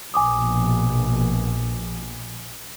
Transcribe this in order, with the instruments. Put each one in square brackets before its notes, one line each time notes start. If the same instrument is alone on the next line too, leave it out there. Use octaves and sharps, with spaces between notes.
[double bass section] A#1 B2 [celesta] G#5 D6 D#6